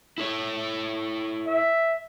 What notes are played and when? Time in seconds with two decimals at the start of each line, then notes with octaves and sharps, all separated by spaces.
0.18 E4 A4 C#5
1.46 E5